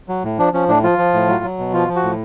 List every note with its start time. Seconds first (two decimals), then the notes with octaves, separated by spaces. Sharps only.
0.09 F#3
0.24 A2
0.38 F3 D4
0.53 F3 C#4
0.68 A2 D4
0.84 F3 F4
0.98 F3
1.14 A2
1.28 F#3
1.44 F#3
1.58 B2
1.73 F3 F4
1.88 F3
1.96 F#4
2.03 A2